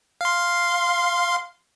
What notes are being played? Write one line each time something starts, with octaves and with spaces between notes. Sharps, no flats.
F5 C6